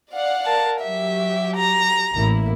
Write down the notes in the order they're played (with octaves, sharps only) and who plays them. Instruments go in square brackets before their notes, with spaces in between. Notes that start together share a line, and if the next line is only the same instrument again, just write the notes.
[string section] D5 F5 F#5
[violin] A#4 A5
[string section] F#3 G4 [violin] E5
[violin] A#5
[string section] A1 A#3 E4